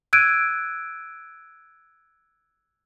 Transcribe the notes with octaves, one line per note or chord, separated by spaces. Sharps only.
E6 F#6 G#6 D7 D#7